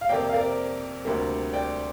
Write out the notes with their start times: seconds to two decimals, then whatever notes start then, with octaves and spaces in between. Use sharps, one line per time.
0.01 F5
0.09 F2 C3 A#3 D5 G5
0.29 F5
0.34 A#4 D5
1.05 D2 C3 G3 A#3
1.53 D5 G5